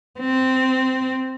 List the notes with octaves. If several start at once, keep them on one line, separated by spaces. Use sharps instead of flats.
C4